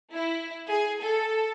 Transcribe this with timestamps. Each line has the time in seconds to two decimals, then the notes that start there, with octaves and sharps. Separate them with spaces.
0.13 E4
0.67 G#4
1.01 A4